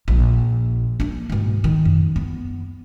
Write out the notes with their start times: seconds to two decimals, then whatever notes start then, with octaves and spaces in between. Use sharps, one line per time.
0.08 A#1
1.00 A#3 D4
1.30 G#2 B2
1.64 D#3
1.85 F#2
2.16 B3